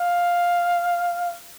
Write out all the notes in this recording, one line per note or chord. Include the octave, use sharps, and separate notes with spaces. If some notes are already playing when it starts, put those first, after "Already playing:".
Already playing: F5